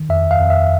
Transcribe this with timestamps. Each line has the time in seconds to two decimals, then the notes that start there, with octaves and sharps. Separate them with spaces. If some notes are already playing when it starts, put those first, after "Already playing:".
Already playing: D#3
0.09 F2 E5
0.31 F5
0.40 F2
0.50 E5